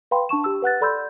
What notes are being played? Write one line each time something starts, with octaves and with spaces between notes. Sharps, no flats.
B4 F5 G5 B5 C6
D4 A5 C#6 E7
G4 E6
B4 F#5 F#6 A6
A4 D5 B5 C6 E6 G6